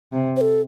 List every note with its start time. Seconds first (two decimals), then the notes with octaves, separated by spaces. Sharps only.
0.13 C3
0.36 C5
0.41 A4